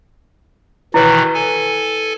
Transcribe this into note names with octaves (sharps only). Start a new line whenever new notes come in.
B2 D#3 E3 E4 B4 C#5
A4 G#5